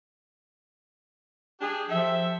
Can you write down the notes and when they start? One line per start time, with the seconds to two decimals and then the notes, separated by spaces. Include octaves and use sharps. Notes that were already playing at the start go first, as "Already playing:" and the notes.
1.60 D4 G4 G#4
1.89 F3 G4 A4 E5